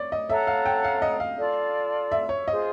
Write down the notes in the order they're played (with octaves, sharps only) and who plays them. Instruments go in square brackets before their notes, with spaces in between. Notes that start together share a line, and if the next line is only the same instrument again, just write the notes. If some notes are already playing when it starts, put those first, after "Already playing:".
Already playing: [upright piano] C#5 D5
D#5
[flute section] A4 C#5 F#5 A#5 [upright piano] E5
[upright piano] F5
G5
F5
D#5
F5
[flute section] F4 A4 D5
[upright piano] E5
C#5
[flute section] F4 G#4 C5 [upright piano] D#5